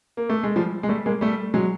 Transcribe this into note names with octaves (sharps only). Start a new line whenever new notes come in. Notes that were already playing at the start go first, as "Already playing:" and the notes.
A#3
A3
G#3
F3 G3
G#3
G3 A3
G#3 A#3
G3 A3
F#3 G#3